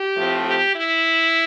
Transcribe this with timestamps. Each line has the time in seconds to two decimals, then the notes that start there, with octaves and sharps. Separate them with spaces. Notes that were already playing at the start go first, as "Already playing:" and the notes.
Already playing: G4
0.15 A2 F3 A3 C4
0.44 G4
0.74 E4